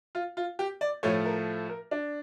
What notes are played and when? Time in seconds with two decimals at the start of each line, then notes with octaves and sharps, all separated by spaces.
0.15 F4
0.37 F4
0.59 G4
0.81 D5
1.03 A2 F3 A3 C#5
1.25 A#4
1.69 A#4
1.91 D4